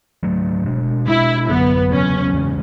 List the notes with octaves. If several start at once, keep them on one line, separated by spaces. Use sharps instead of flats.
G#2 F#3 A3
B2 G#3 D4
B2 G#3 D4 E4
F#2 D3 F#3 B3
E2 C#3 F#3 C#4
E2 C#3 E3 G#3